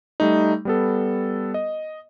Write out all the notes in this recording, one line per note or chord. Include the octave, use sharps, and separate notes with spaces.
G3 A3 D#4
G3 B3 A4
D#5